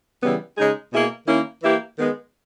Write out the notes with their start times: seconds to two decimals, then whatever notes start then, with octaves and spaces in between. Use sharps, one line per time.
0.23 C#3 E3 G3 B3
0.58 C#3 G#3 D#4 G#4
0.93 B2 A#3 E4 G#4
1.28 D#3 A#3 C#4 E4
1.63 E3 A#3 E4 G4
1.98 D#3 G#3 B3